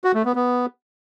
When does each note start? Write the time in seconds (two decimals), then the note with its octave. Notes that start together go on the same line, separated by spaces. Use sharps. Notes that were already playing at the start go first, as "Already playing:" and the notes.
0.04 F#4
0.15 A3
0.25 B3
0.35 B3